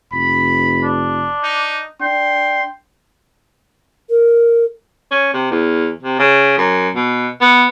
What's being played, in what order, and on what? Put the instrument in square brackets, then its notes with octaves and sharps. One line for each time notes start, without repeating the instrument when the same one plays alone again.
[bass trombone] F1 [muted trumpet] B5
[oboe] D4
[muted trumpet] D#4
[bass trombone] D4 [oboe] G5 [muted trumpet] C6
[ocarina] A#4
[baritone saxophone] C#4
C3
E2
C3
C#3
F#2
B2
B3